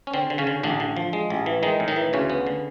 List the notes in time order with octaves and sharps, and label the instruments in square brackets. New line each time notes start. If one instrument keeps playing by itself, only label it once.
[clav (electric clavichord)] C#4
D3 C4
D3
C#3 C#4
D3
A1 D3 D4
D3
F3
G#3
A1
E3
D#3 G#3 D#4
A2
D#3 D#4
E3
D2 C#3 C#4
B3
D3